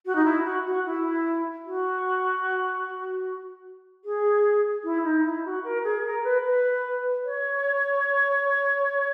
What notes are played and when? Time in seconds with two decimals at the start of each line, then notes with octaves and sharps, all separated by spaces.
0.06 F#4
0.15 D#4
0.25 E4
0.44 F#4
0.65 F#4
0.85 E4
1.66 F#4
4.04 G#4
4.84 E4
5.04 D#4
5.25 E4
5.45 F#4
5.64 A#4
5.84 G#4
6.05 A#4
6.24 B4
6.45 B4
7.25 C#5